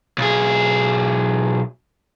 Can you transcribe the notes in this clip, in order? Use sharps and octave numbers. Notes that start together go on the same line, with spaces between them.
B1 G#4